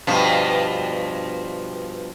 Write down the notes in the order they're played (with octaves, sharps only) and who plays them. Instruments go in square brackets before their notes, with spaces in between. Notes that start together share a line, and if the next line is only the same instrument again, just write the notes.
[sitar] G2 B2 F3